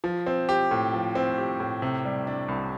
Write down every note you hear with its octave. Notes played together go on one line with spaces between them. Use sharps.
F3
C4
G4
A2
F3
C4
G4
A2
C3
G3
D4
C2